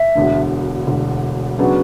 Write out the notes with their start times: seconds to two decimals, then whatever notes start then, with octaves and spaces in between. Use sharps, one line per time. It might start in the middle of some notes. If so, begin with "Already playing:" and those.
Already playing: E5
0.15 E1 D2 D3
0.87 E1 D2 D3
1.59 C#3 F#3 B3 D4 F#4